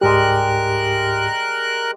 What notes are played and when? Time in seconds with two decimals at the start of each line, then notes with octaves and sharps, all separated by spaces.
0.01 C#2 G#2 G3 G#3 G4 A#4 F#6